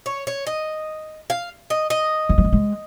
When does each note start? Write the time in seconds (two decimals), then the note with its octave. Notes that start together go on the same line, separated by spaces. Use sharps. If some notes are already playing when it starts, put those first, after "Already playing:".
0.06 C#5
0.27 C#5
0.47 D#5
1.30 F5
1.70 D#5
1.90 D#5
2.29 D#3
2.38 F3
2.44 G3
2.53 G#3